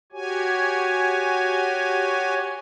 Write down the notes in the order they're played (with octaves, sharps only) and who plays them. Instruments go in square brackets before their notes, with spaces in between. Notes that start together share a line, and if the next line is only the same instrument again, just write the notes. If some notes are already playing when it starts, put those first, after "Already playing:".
[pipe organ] F#4 G4 C#5 G#5